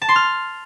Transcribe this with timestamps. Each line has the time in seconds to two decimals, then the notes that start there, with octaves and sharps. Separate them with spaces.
0.02 A5
0.09 C6
0.16 F6